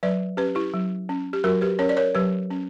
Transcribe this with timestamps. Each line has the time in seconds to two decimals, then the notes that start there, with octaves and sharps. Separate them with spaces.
0.03 F#3 B4 D5
0.37 C#4 G4 B4
0.55 E4 G4
0.74 F#3
1.09 C#4
1.33 G4
1.44 F#3 F#4 A#4
1.61 G4 B4
1.79 C#4 A#4 C#5
1.89 D5
1.97 A#4 C#5
2.15 F#3 G4 B4
2.50 C#4